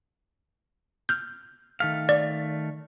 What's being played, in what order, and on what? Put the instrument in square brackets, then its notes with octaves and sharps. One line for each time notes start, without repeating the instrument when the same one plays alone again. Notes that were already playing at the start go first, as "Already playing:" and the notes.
[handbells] F6 G6
[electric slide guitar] D#3 A3 F5
[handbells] D5